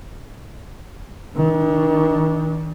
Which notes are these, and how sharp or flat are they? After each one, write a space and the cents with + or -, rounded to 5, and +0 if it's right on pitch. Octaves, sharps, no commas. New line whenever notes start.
D#3 +35 D4 +0